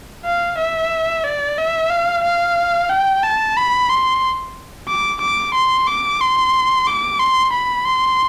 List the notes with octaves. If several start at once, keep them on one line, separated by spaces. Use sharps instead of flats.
F5
E5
D5
E5
F5
F5
G5
A5
B5
C6
D6
D6
C6
D6
C6
D6
C6
B5
C6